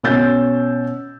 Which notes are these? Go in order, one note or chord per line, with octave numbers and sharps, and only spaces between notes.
B2 C#4 E6 G6 A6